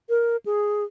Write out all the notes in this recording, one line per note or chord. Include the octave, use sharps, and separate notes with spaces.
A#4
G#4